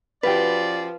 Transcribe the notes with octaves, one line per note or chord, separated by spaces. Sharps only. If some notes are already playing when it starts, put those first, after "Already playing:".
F3 C#4 F#4 G4 B4 D5